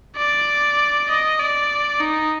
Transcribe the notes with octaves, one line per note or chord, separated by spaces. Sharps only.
D5
D#5
D5
D#4